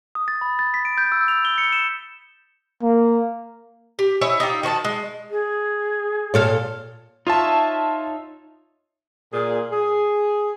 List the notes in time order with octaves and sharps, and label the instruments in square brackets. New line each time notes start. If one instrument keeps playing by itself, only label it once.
[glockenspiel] D#6
A6
B5
A6
B6
D7
G6
E6
F7
G7
C#7
E7
[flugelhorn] A#3
[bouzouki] G4
E4 C#5 D#5 G#5
D#4 F4 G4
D#3 F#4 C#5 A5
G#3
[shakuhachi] G#4
[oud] A#2 A4 F5 [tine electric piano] C#5
[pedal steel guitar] D#4 C#5 E5 [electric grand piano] F4 A5
[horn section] A#2 G#4
G#4